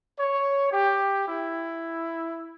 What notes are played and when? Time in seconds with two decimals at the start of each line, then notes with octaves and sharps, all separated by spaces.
0.18 C#5
0.72 G4
1.27 E4